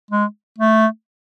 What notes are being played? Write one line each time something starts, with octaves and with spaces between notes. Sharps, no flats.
G#3
A3